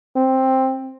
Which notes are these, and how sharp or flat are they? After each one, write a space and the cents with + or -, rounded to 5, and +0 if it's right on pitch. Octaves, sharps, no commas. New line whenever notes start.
C4 +10